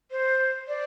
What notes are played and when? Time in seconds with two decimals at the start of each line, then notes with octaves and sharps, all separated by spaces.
0.11 C5
0.68 D5